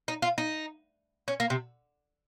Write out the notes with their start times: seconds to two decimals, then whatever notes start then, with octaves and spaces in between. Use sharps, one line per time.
0.08 D#4
0.22 F4
0.38 D#4
1.28 C#4
1.40 A#3
1.50 C3